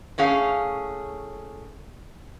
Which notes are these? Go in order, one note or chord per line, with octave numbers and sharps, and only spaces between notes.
A2 C#4 G#4 F5